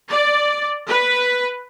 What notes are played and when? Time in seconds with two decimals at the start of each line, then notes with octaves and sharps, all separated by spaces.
0.11 D5
0.87 B4